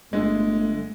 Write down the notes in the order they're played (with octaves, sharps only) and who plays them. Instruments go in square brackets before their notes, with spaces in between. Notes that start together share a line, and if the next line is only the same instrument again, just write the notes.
[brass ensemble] G1 A3 [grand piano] D3 G#3